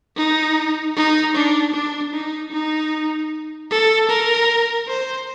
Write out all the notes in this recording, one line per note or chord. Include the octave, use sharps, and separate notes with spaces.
D#4
D#4
D4
D4
D#4
D#4
A4
A#4
C5